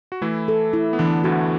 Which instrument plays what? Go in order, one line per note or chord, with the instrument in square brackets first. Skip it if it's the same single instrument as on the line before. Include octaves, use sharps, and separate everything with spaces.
[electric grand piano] F#4
[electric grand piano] E3 E4 [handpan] A3
[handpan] A4
E4
[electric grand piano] B3
[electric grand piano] D3 D4 [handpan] E3
[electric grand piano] D2 D3 [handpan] F#4